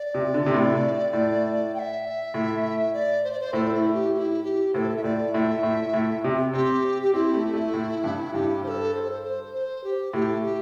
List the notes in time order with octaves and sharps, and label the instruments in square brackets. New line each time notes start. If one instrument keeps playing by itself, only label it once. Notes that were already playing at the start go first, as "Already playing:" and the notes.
Already playing: [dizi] D5
[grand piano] C3
D3
C3
A2
A2
[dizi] G5
E5
[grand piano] A2
[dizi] D5
C5
D5
C5
[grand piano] A2 [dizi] A4
[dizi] E4
G4
G4
E4
G4
[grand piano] A2 [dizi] C5
[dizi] A4
E5
[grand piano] A2 [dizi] D5
[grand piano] A2 [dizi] E5
[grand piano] A2
A2
C3
[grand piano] C4 [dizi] G4
[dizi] G4
[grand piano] C4 [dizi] E4
[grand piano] A3
A3
A2
G2
[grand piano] G2 [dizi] G4
[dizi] C5
A4
C5
A4
C5
C5
C5
G4
[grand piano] A2 [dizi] G4
[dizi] G4